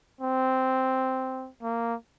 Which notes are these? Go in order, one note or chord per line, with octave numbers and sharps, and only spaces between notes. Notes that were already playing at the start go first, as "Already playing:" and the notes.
C4
A#3